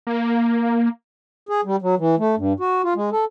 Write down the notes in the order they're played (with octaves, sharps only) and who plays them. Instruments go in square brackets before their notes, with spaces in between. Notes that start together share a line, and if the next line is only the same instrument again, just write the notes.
[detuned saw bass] A#3
[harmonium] G#4
G3
F#3
E3
A3
G2
F#4
F4
G#3
A4